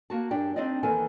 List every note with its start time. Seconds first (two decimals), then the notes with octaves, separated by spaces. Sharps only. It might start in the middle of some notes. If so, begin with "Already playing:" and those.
0.10 A#3 F#4 A5
0.31 F#2 D4 G4 G5
0.56 G3 C4 D4 D#4 D5 D#5
0.83 E2 D#3 E3 A#3 A4 G#5